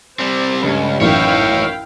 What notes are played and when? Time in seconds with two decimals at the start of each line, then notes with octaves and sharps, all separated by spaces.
0.19 G3 C4 C5 D5
0.62 C#2 G2 A3 C#4 B5
1.01 A1 F#2 D#3 E4 C#5 E5 F5 G5